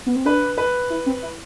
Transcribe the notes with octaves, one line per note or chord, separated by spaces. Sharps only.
B3
C4
D4 B4
B4
E4
C4
E4